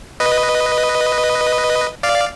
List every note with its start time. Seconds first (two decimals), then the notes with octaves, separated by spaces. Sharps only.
0.20 B4 D#5
2.03 D5 F5